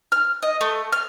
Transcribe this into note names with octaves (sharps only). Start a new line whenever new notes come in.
F6
D#5
A3
F6